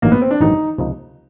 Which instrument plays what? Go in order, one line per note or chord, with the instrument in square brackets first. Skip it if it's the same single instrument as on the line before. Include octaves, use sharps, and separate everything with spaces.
[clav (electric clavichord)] A1 G2 D#3 F#3 [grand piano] A#3
[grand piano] B3
C4
D4
[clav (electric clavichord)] A1 G2 D#3 F#3 [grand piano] D#4
[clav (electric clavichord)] C#2 C3 F3 A#3 D#4